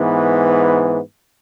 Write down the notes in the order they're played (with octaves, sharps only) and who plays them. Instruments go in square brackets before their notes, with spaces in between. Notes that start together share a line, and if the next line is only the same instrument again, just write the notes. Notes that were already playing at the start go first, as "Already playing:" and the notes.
Already playing: [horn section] G#2 E3 B3